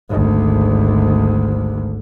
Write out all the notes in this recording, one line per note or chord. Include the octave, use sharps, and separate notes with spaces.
G#1 D2